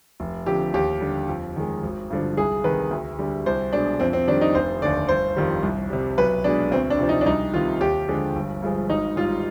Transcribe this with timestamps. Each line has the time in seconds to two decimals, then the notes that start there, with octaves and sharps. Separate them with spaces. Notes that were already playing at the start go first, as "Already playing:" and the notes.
0.20 F1
0.46 F2 D3 G4
0.74 D#2 G4
1.01 D3 G3
1.29 F2
1.56 D#3 G#3
1.83 G#1
2.10 G2 D3 F3
2.37 C2 G#4
2.64 C3 D#3 B4
2.91 D2
3.19 D3 G3
3.46 C2 C5
3.73 B2 G#3 D4
4.00 F2 C4
4.13 C4
4.27 D#3 G3 D4
4.41 D#4
4.55 F1 C5
4.82 D#2 D3 D5
5.09 G1 C5
5.36 F2 D#3 G3
5.63 C2
5.90 C3 G3
6.18 B1 B4
6.44 B2 G#3 D4
6.71 D2 C4
6.90 D4
6.99 C3 F3
7.09 D#4
7.21 D4
7.26 C2 D#4
7.54 C3 D#3 F4
7.80 D#2 G4
8.08 D3 F3 G#3
8.36 G1
8.62 G2 F3 G#3
8.90 G#1 D#4
9.16 G#2 G3 F4